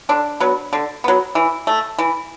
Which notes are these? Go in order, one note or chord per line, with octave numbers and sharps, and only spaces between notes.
D3 D4
F#3 B3
D3
F#3 B3
E3
A3
E3